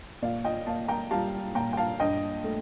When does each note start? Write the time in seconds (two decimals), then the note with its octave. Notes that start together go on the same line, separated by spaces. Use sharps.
0.22 A#2 D5 F5
0.44 D#5 G5
0.67 A#3 F5 A5
0.88 G5 A#5
1.11 G3 F5 A5
1.55 A#2 G5 A#5
1.73 G5
1.77 F5 A5
2.00 G2 D#5 G5
2.44 A3